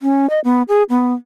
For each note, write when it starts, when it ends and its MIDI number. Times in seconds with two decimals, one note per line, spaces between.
0.01 0.29 61
0.30 0.40 75
0.44 0.62 59
0.68 0.83 68
0.89 1.14 59